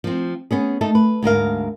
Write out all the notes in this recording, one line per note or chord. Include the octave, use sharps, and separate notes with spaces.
F3 C4
B3 C#4 G#4
A3 D#4 A4
B4
D2 G#2 A#4 F5